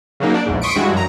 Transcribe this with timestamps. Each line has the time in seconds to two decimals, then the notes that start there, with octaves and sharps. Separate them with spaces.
0.20 C#3 F#3 A#3 D#4
0.34 D4 D5
0.46 A#1 E2 G#2
0.61 C6 C#6 D#6 B6 C#7 D7
0.76 G2 E3 G#3 F#4
0.93 F#2 A#5